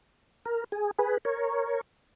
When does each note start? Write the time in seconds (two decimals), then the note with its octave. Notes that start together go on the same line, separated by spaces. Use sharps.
0.45 A#4
0.72 G#4
0.99 G#4 B4
1.25 A#4 C#5